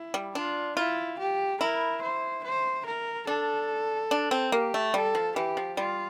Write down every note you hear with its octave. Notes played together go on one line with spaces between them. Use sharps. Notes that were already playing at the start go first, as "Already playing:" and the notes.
Already playing: E4
G3
D4 F4
E4 F4
G4
E4 A#4
C5
C5
A#4
D4 A4
D4
C4
A#3 G4
A3
G3 A4
F3
E3 G4
F3
G3 F4